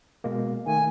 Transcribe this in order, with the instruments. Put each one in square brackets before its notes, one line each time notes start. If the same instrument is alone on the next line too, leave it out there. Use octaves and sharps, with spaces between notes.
[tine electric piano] B2 G#3 A#3
[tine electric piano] D#3 A3 [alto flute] G#5